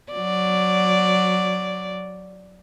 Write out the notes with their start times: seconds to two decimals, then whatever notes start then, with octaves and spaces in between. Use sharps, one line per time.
0.12 F#3 D5